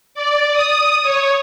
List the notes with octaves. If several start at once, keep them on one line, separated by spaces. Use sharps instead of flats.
D5
D#6
C#5